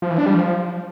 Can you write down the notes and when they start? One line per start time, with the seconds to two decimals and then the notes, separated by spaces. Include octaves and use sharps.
0.02 F3
0.10 E3
0.18 D4
0.26 G3
0.34 F3